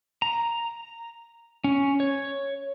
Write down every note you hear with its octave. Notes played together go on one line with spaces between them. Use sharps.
A#5
C#4
C#5